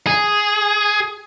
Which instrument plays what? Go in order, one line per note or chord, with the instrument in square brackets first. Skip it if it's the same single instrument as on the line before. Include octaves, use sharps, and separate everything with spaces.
[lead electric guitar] G#4